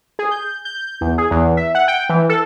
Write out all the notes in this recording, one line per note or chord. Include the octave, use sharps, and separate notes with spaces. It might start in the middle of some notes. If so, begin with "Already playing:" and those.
G#4
G6
G6
E2
G#4
E2
E5
F#5
G5
E3
A4